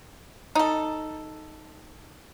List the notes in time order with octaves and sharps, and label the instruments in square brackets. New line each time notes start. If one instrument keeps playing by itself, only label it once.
[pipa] D#4 A4